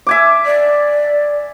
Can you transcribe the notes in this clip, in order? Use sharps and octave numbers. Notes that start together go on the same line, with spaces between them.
E5 G#5 D6
D5